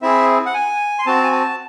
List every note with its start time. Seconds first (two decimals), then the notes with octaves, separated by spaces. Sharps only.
0.02 C4 E4 G#4 E5
0.46 F#5
0.54 G#5
0.99 C6
1.06 C4 F#4 A5
1.24 G#5
1.32 A5